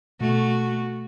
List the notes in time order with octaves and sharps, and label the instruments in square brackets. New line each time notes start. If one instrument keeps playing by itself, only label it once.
[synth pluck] B2 [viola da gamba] A3 F#4